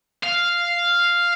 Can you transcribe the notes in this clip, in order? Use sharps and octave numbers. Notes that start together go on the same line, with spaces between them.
F5